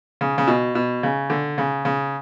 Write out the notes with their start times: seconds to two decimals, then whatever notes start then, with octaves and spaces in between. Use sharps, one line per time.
0.21 C#3
0.38 C#3
0.48 B2
0.75 B2
1.03 C#3
1.30 D3
1.58 C#3
1.85 C#3